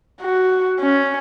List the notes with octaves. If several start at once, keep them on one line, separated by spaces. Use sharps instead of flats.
F#4
C#4